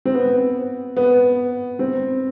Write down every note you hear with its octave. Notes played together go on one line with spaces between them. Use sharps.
C4
B3
B3
C4